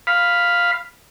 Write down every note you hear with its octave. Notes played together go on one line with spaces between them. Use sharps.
F5 B5